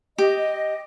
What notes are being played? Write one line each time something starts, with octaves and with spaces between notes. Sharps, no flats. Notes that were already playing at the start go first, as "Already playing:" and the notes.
G4 D#5